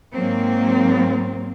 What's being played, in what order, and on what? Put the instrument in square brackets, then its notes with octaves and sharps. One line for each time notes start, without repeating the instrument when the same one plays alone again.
[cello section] G#2 F#3 A#3 C4